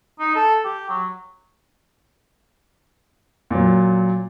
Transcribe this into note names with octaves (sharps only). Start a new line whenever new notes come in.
D#4
A4
G4
F#3
A#2 F#3